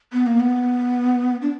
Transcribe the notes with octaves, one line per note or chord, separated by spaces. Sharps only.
B3
A#3
B3
D4